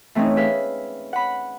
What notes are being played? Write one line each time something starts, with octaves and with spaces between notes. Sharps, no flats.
E3 A3 C4 C#4 D#4
G#4 B4 E5 F5
F#5 B5